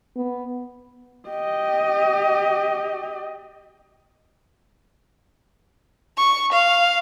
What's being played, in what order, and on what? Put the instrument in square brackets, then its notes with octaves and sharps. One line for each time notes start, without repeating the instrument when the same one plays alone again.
[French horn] B3
[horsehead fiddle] G4 D#5
[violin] C#6
F5